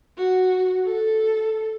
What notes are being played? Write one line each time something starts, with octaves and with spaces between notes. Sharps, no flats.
F#4
A4